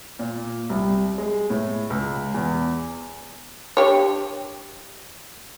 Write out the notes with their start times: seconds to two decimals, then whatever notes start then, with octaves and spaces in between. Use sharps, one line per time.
0.19 A#2
0.69 C2
1.18 G#3
1.50 A2
1.90 C#2
2.34 E2
3.77 D4 G4 C#5